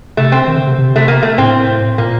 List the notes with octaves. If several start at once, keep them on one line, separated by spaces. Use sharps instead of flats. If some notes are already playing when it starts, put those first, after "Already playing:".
C3 A3
C4
D#3
D3
C3
C3
A3
A#3
A3
A2 C4
A#2 A#3